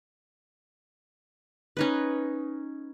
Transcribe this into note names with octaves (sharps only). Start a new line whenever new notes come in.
C#4 D#4 B4